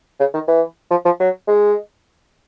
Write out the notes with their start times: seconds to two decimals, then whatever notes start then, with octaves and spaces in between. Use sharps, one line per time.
0.20 C#3
0.34 D#3
0.48 E3
0.91 F3
1.05 F3
1.20 F#3
1.48 G#3